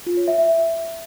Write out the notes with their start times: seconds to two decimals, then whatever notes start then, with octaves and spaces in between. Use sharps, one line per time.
0.06 F4
0.17 C#5
0.28 E5
0.38 E5